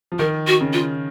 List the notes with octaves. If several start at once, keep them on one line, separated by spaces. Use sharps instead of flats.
F3
D#3 A#4
F#4
C#3
F4